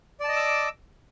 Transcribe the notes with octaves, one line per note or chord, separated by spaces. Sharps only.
D5 D#5 A5 D6 E6